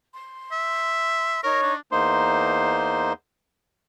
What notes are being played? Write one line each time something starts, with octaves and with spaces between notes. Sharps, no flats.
C6
E5
D#4 A#4 C#5 C#6
D4
E2 A#3 D#4 C5 C6